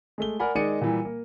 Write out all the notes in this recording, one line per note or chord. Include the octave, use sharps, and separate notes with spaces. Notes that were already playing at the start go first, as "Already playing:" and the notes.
G#3 A3 G7
A#4 D5 F#5 G#5 B5
D#3 G#3 D#4 D5 C#7 D#7
A#2 E3 G3
A#3